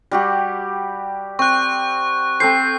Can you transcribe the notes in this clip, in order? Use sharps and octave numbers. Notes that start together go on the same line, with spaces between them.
G3 F#4 G4
C4 C#6 F#6
C4 A4 C5 C7